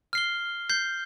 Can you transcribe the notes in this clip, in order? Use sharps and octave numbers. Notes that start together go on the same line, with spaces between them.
F6 C7 G7
G6 C7 G7